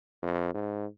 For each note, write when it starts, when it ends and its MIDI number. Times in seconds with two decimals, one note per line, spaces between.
0.23 0.53 41
0.54 0.86 44